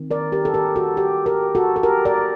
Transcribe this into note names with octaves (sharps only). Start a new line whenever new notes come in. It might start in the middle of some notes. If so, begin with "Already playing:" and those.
Already playing: D#3 C4
A#4 D5
G4 A#4
A4
G4 A#4
F#4 A4
G4
G4 A#4
F#4 A4
A4
G4 A#4
A#4 D5